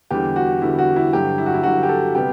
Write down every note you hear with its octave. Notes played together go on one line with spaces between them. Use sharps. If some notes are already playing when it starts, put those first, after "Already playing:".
E2 D3 G3 G4
F#4
E2 D3 G3 E4
F#4
E4
G2 D3 F#3 G4
E4
F#4
E4
G2 D3 F#3 F#4
G4
A4
C3 G3 B3 G4